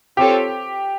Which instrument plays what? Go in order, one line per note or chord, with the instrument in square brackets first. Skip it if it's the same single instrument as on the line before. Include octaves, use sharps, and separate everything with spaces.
[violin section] C4 F4 A4 C#5 [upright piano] G4